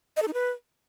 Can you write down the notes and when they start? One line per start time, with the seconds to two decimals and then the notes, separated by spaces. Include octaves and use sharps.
0.16 D#5
0.22 A4
0.28 D#4
0.33 B4